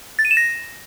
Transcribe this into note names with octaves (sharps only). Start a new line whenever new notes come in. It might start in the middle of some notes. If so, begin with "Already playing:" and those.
A6
D#7
E7
A#6